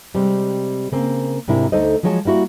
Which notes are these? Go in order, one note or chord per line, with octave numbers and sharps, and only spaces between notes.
C3 G3 G#3 C4
C#3 A#3 C4
G#2 C3 D4 E4 A#4
D2 A3 D#4 A4 C5 D#5
F3 F#3 G#3 C#5 G5 A5
G3 A#3 E4 F#4 E5